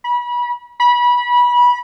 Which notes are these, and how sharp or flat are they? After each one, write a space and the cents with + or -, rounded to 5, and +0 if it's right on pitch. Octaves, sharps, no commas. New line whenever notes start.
B5 -30
B5 -25